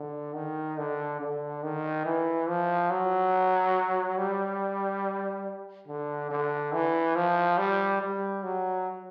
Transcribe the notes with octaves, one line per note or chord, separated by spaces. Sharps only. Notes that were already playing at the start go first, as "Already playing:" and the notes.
Already playing: D3
D#3
D3
D3
D#3
E3
F3
F#3
G3
D3
D3
E3
F3
G3
G3
F#3